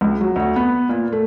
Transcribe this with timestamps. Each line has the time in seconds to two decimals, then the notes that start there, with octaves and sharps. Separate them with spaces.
0.01 C#2
0.21 F#3
0.36 D2
0.56 B3
0.89 A#2
1.12 A3